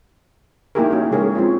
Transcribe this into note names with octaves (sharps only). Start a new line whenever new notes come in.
A#3 D#4 E4 G4 G#4 A#4
C#4 F#4
C#3 G#3 G#4 A#4 C#5
C4 F4 C#5